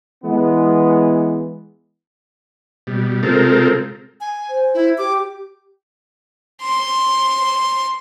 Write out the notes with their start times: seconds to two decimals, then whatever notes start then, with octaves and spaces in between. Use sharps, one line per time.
0.24 E3 G#3 B3
2.87 B2 G3
3.23 C3 G#3 C4 F4 A4 A#4
4.21 G#5
4.49 C5
4.74 E4
4.98 G4 D6
6.62 C6